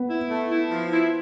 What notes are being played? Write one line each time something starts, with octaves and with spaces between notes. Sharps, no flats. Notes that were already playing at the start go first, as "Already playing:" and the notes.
Already playing: B3
E4
A3
E4
F3
E4